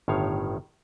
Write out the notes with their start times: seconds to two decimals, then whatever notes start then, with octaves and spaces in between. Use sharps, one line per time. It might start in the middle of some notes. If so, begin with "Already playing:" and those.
0.08 G1 A2 D#3 C#5 F5